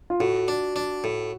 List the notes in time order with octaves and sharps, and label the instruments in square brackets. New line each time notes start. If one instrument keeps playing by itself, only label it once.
[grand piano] F4
[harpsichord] A2 [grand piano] F#4
[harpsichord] D4
D4
A2